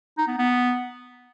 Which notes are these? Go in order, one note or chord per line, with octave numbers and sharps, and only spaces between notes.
D#4
B3
B3